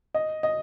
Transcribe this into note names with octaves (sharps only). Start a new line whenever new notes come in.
D#5
D#5